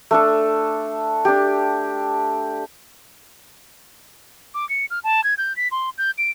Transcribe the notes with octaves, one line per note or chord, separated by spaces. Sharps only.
A3 D4 A4
D4 G4
D6
C#7
F6
A5
G#6
G6
B6
C6
G6
D7